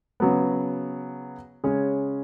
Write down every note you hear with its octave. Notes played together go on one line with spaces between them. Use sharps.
C#3 F#3 B3
C#3 G#3 C#4 G#4 C#5